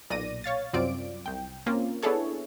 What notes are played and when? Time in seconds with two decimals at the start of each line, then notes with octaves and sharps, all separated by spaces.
0.10 B1 A#2 D5 A#6 D#7
0.44 C#5 F5 A6
0.73 C2 F#2 C4 F4 D5 D7
1.26 C2 G5
1.66 A#3 C4 C#4 F4
2.03 B3 D4 E4 G#4 A4 C#5